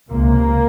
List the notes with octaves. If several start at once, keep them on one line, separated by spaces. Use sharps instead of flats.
C#2 C3 A#3